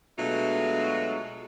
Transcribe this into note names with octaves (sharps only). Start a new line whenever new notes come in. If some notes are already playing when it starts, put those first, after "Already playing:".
B2 F#3 G#3 A3 D4 F4